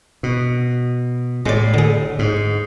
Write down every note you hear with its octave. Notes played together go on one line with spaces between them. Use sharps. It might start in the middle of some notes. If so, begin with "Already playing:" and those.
B2
A2 G#3 D5
D3 G#4
G#2